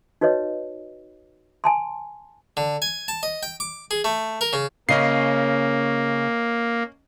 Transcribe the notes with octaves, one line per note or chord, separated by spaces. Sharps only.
D#4 F#4 B4 C#5 D#5
G#5 A5 C6
D3
G#5
A5
D#5
G5
D6
G#4
A3
A#4
C#3
C#3 A#3 C#4 D#5 C7